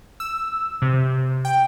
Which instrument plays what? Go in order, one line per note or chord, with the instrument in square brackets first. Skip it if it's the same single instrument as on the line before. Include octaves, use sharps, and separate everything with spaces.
[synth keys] E6
C3
G5